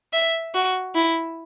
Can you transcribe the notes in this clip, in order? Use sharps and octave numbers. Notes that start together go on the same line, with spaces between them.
E5
F#4
E4